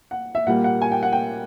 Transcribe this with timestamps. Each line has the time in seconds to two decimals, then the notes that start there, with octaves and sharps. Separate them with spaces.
0.11 F#5
0.35 E5
0.47 A#2 G3 A#3 F#5
0.64 F#5
0.82 G#5
0.92 G5
1.03 F#5
1.13 G5